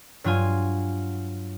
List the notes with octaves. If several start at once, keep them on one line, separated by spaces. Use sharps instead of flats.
G2 F#3 F4 G#5